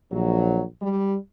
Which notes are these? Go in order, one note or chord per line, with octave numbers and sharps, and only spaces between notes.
A#1 F#3
G3